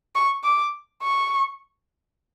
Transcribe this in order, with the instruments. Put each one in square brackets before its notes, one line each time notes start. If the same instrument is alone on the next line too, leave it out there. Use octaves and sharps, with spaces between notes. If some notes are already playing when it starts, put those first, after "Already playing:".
[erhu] C#6
D6
C#6